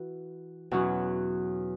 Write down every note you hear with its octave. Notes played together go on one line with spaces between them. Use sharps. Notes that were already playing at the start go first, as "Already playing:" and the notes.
Already playing: E3 F#4
E2 B2 F#3 C#4 F#4